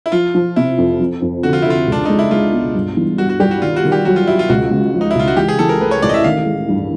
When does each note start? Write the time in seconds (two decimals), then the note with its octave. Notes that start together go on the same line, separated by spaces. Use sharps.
0.06 E4
0.12 F3 F4
0.35 F3
0.56 C3 E4
0.78 F2
1.00 F3
1.22 F2
1.43 D3 F#4
1.53 F4
1.62 D3 E4
1.70 F4
1.87 C#2
1.92 D4
2.05 G#3 D#4
2.19 E4
2.31 G#3 F4
2.53 B2
2.75 G2
2.97 E3
3.18 G3 F#4
3.29 F#4
3.40 G3 G4
3.51 F#4
3.62 D#3 F4
3.76 F#4
3.84 D#3
3.92 G4
4.05 F#3 F#4
4.16 F4
4.27 F#3 E4
4.39 F4
4.49 C#2 F#4
4.71 C#3
4.94 F3
5.01 D#4
5.11 E4
5.15 C#2 F4
5.27 F#4
5.37 E3 G4
5.48 G#4
5.59 E3 A4
5.69 A#4
5.81 A3 B4
5.91 C#5
6.02 A1 D5
6.09 D#5
6.14 E5
6.24 D#3 F5
6.46 G#3
6.69 G2